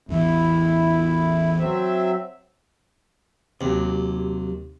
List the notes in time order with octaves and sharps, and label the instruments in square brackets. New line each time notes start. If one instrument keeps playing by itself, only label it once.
[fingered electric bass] A1 E2 E3 [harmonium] E4
[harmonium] F#3 C4 E5
[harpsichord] D#2 [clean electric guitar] C3 F#3